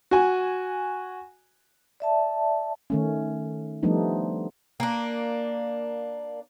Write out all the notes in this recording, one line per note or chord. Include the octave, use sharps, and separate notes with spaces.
F#4 G#5
D5 E5 A5
D#3 A3 C#4
F3 G3 A3 B3 D4 D#4
A#3 D4